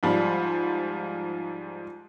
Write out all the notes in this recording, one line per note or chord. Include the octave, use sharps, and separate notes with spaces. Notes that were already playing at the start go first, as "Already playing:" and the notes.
G#2 F3 G3